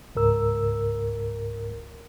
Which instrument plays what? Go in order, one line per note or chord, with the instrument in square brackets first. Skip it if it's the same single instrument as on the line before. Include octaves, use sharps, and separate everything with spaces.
[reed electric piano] C#2 G#2 A#4 E6